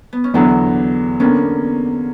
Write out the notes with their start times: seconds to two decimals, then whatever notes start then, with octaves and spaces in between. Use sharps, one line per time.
0.13 B3
0.24 C#4
0.34 E2 D3 F#3 B3 D4
1.20 D3 A#3 B3 C#4 D4